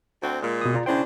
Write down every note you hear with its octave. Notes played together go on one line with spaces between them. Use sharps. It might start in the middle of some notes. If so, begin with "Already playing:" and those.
D2 C4 F#4
A#2 G#3
B2 D#6
F4 D5 A#5
C#3 C#4 D4 E4 C5 G5